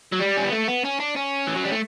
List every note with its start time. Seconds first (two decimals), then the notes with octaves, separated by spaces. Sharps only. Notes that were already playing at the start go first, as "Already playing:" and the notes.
0.12 F#3
0.20 G3
0.37 C#4
0.44 B3
0.52 A3
0.68 B3
0.84 C#4
1.00 D4
1.16 C#4
1.47 E3
1.56 F#3
1.64 G3
1.71 A3